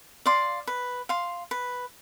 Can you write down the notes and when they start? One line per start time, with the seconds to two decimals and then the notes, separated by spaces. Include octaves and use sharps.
0.26 D5 F5 C6
0.67 B4
1.09 F5 C6
1.51 B4